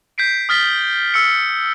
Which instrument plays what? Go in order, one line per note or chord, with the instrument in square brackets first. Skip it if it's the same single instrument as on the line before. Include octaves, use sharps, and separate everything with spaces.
[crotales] G6 B6 C7 D7
D#6 F6 A6 B6 G7
E6 C#7